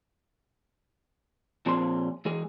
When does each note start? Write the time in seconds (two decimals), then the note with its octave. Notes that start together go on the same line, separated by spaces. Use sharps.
1.66 A#2 F3 C4 G#4 C6
2.25 E3 G#3 G#4